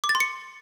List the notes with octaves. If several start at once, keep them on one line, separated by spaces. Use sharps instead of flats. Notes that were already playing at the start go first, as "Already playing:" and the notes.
D6
A6
C6
C#7